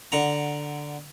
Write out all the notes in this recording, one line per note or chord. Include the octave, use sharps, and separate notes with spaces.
D3 F#5 A#5